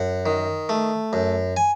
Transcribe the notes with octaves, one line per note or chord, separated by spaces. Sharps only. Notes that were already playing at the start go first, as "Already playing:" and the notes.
Already playing: F#2 F#5
D#3
A3
F#2
G#5